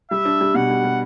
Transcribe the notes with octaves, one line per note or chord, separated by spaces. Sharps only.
G3 E5
D4
G3
B2 F#5
G3
G3